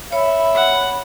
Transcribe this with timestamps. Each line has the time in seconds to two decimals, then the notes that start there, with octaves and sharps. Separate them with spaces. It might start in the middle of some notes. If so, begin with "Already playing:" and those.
0.13 C#5 E5 B5
0.56 F#5